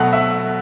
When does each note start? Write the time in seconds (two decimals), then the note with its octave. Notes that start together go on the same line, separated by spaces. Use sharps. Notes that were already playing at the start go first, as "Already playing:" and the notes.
Already playing: B2 F#3 A3 F#5 A5
0.13 E5